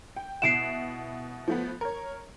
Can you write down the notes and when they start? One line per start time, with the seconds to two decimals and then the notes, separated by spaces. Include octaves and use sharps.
0.16 G5
0.42 B2 E4 F#5 C7 D7 E7
1.48 F3 A3 B3
1.81 A#4 C#5